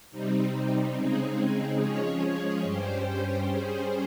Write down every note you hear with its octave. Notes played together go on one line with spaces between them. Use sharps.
C3 G3 C4 D#4
C#3 G#3 C4 D#4 G#4
F3 G#3 C#4 G#4 C#5
G2 G3 C#4 G4 C5
G3 C#4 G#4 C5